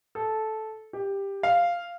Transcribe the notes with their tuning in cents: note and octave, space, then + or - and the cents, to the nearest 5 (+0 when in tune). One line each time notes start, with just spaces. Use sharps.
A4 -10
G4 +10
F5 -5